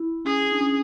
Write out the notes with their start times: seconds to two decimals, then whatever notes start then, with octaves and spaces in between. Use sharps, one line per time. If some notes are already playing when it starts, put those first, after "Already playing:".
Already playing: E4
0.25 C#4 G#4
0.52 D4
0.61 C#4